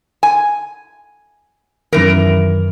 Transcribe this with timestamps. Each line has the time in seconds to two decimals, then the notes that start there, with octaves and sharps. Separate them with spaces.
0.23 G#5
1.93 F#2 D#3 E3 A#4